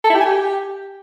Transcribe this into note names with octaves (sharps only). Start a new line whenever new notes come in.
A4
E4
G4
G#5
G4